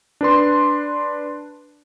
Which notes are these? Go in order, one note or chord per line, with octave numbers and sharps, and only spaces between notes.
D4 B4 C6